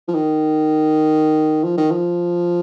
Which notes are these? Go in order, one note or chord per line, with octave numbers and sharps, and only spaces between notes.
F3
D#3
F3
D#3
F3